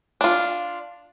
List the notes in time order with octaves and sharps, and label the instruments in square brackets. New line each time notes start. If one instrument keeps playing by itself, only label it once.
[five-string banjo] D4 F4